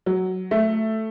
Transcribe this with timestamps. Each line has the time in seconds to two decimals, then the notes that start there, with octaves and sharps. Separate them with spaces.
0.06 F#3
0.51 A3